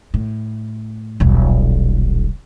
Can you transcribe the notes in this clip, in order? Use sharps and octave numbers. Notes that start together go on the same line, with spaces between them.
A2
D#1 B1